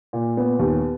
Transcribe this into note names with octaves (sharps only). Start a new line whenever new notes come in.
A#2
B3
D#2